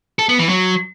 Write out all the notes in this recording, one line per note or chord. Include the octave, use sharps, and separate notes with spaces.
A4
B3
E3
F#3